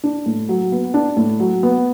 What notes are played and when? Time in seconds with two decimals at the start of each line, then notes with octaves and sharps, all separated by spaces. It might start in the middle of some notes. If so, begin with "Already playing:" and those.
0.04 D4
0.26 A2
0.49 F#3
0.72 B3
0.94 D4
1.17 A2
1.40 F#3
1.63 B3